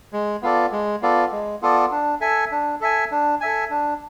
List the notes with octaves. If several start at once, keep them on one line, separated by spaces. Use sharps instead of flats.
G#3
B3 F4 A4 D5
G#3
B3 F4 A4 D5
G#3
B3 F4 A4 D5
D4
A4 E5 G#5
D4
A4 E5 G#5
D4
A4 E5 G#5
D4